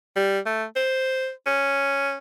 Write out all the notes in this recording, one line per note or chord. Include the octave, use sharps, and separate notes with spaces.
G3
A3
C5
C#4